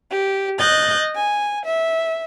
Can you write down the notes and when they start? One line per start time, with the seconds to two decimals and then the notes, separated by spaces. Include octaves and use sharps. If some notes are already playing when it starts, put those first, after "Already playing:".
0.11 G4
0.58 D#5 F#6 G6 A6
1.15 G#5
1.65 E5